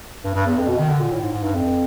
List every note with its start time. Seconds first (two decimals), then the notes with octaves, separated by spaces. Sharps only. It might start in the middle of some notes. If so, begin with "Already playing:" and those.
0.24 G2
0.34 G2
0.46 E2
0.57 F2
0.67 B2
0.78 D#3
0.89 D3
1.00 A#2
1.11 A2
1.21 G#2
1.32 G#2
1.43 G2
1.54 F2